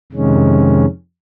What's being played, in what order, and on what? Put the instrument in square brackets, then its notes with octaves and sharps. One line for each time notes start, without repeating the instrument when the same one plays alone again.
[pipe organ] F2 C3 D#3 G#3 C#4